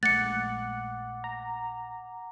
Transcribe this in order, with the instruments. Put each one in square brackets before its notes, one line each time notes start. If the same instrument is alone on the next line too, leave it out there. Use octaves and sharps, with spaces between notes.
[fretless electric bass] A#1 G#3 A3 [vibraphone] F#5 D6 [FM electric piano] F#6 [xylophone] A6 C#7
[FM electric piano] A#5